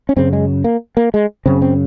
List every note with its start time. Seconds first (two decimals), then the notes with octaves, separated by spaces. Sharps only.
0.09 C#4
0.16 F#2 C#3 C4
0.33 G#3
0.64 A#3
0.97 A#3
1.14 G#3
1.46 F#2 C#3 C4
1.62 C4